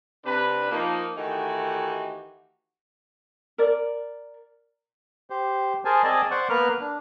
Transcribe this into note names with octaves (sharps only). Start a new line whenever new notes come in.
C3 D4 B4
F3 A#3 D#4
D#3 E3 A3 D#4 F#4 G4
A#4 D5
G4 C5
G#4 A#4 C5 G#5 A5
C4 G#4 D5 D#5 G#5 A5
C5 D5 F#5 C#6
A#3 B3 A#4 B4 F6 F#6
D4